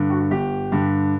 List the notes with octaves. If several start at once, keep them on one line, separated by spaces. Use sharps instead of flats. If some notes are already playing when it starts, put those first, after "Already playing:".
Already playing: G2 D3
F#4
G1 G4
G2 D3